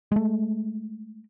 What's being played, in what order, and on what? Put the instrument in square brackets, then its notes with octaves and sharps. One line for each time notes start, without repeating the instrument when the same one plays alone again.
[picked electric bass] G#3 A3